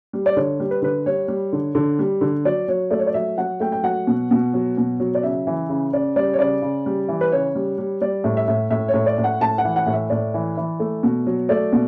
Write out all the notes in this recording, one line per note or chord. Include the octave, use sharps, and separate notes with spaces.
G3
D5
D3 C#5
G3
B4
D3 B4
G3 C#5
G3
D3
D3
G3
D3
F#3 D5
F#3 C#5
A3 D5
C#5
D5
F#3 E5
F#3 F#5
A3 G5
G5
F#3 F#5
B2
B2
F#3
B2
F#3
D5
C#3 E5
E3
C#3
C#3 D5
G3 D5
C#5
C#3 D5
C#3
G3
E3
B4
C#3 C#5
G3
G3
G3 D5
A2
E5
A2
A2 E5
C#5
A2
D5
A2
F#5
A2 A5
F#5
E3
F#5
A2
E5
A2 D5
E3
E3
A3
B2
F#3
A3 D5
B2